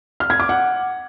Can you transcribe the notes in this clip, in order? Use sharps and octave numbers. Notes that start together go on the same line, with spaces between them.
F6
G#6
D6
F#5